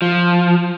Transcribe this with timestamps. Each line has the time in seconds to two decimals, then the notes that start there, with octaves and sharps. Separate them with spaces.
0.02 F3